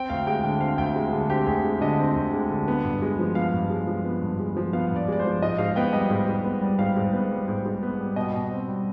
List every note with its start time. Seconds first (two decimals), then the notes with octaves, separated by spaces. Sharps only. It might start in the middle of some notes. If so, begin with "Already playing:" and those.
Already playing: C4 G5
0.10 D2 F5
0.27 G#3 G5
0.44 D3 G5
0.61 C4 F5
0.78 D2 G5
0.96 G#3
1.12 D3 G#4
1.30 C4 G4
1.47 D2 G#4
1.64 G#3
1.81 D3 D#5
1.99 C4
2.15 D2
2.34 G#3
2.50 D3
2.68 B3
2.84 G2
3.02 G#3
3.19 F3
3.35 B3 F5
3.53 G2
3.70 G#3
3.87 F3
4.05 B3
4.22 G2
4.39 G#3
4.57 F3
4.73 B3 F5
4.91 G2 D5
5.08 G#3 D5
5.19 C5
5.25 F3
5.42 G#2 D#5
5.58 G#2 F5
5.76 B3 G5
5.93 G3 D#5
6.10 G#2
6.28 G#2
6.44 B3
6.61 G3
6.79 G#2 F5
6.96 G#2
7.13 B3
7.31 G3
7.48 G#2
7.65 G#2
7.83 B3
8.00 G3
8.16 B2 D#5
8.34 B2
8.51 C4
8.68 G3